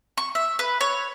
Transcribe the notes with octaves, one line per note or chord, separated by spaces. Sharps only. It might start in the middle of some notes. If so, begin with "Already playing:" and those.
C#6
E5
B4
C#5